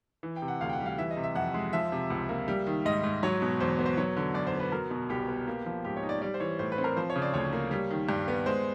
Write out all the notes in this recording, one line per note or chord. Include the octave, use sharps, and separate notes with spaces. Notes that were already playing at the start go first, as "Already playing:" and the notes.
E3
G5
C3
F#5
D2 F5
G5
F#5
G3
F5
E3 E5
D#5
C3
E5
F2 F#5
G#3
F3 E5
C3
C#2
A#3
G3
D#3
G#2 D#5
G#2
F#3 C#5
B2
E2 C5
B3
C5
F#3 C#5
D3
F#2 D5
C5
B3
B4
F#3 A#4
B2
C2 G4
B3
A#3
F3
G#2 G4
C#5
D#4
D5
G3 D5
C5
E3 C#5
A2 C5
B4
C4
A#4
F3 C5
C#5
C#3
D5
D2 C#5
A#3
G3
D#3
G2
B3
G#3 C5